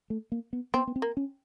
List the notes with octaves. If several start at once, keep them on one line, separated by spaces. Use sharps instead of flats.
A3
A#3
B3
B3 C4
B3
C4
A#3
C#4